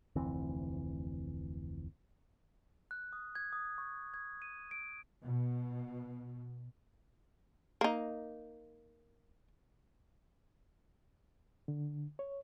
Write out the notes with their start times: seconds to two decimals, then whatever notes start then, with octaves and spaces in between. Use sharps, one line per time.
0.16 F1 D2 E3 C4
2.91 F#6
3.13 D#6
3.35 G#6
3.53 D#6
3.78 C#6
4.14 G#6
4.42 D#7
4.71 D7
5.24 B2
7.81 A#3 D#4
11.68 D3
12.19 C#5